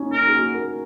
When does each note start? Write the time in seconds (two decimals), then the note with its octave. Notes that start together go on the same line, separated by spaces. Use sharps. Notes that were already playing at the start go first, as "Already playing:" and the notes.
Already playing: C#4 D#4
0.13 D#4 A#4
0.27 G#4
0.34 F#4
0.54 A#4